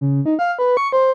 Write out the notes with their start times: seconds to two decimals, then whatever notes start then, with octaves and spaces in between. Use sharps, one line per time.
0.01 C#3
0.26 D#4
0.39 F5
0.59 B4
0.77 C#6
0.92 C5